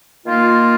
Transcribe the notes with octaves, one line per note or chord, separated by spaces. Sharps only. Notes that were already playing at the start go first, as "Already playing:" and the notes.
D#3 A#3 F4